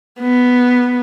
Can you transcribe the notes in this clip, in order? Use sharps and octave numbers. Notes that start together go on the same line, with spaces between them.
B3